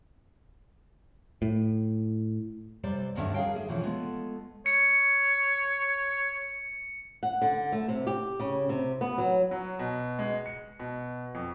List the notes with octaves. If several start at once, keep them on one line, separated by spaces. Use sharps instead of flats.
A2
C3 G3 B4 C5 D5
D2 G2 D#3 C#4 D4 E5
G#4 A#4 C#5 F5 G5
D3 G#4 E5
B2 E3 F3 A3 C#4
G#3 A3 B3 F4
C#5 C#7
F#5
D3
A3
C3
G4
C#3
C3
B3
F#3
F#3
B2
G#3
C#7
B2
F2